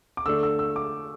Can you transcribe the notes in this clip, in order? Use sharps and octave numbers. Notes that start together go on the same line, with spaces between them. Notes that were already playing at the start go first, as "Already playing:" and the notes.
D6
D3 A3 D4 E6
E6
E6
D6